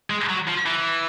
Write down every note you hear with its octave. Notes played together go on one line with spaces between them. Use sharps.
G#3
F#3
F3
E3